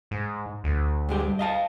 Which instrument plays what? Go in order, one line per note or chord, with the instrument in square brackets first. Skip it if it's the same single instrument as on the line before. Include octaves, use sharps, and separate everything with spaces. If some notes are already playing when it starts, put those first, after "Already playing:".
[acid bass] G#2
D2
[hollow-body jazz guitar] G2 G#3 G4
G2
D#5 F5 A5